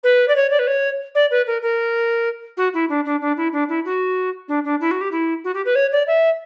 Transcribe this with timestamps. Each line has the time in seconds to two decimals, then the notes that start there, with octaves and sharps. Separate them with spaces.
0.03 B4
0.28 D5
0.35 C#5
0.50 D5
0.59 B4
0.67 C#5
1.15 D5
1.30 B4
1.46 A#4
1.62 A#4
2.57 F#4
2.74 E4
2.89 D4
3.05 D4
3.21 D4
3.37 E4
3.52 D4
3.68 E4
3.85 F#4
4.48 D4
4.64 D4
4.80 E4
4.91 F#4
5.01 G4
5.11 E4
5.44 F#4
5.54 G4
5.65 B4
5.75 C#5
5.92 D5
6.07 E5